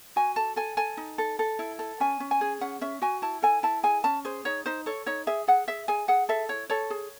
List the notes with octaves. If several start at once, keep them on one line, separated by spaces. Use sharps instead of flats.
F#4 G#5
A4 A5
A4 G#5
A4 G#5
D#4
A4
A4
E4
A4
C#4 G#5
C#4
G#5
G#4
C#4 F#5
C#4 E5
F#4 G#5
E4 A5
A4 G#5
E4 A5
G#4 G#5
C#4 A5
G#4 C5
D#4 C#5
D#4 C5
A4 C#5
D#4 C#5
G#4 E5
G#4 F#5
G#4 E5
G#4 G#5
G#4 F#5
A4 E5
E4 C#5
A4 C#5
G#4